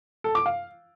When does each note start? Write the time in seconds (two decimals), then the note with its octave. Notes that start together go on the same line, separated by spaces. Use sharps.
0.24 A4
0.35 D6
0.46 F5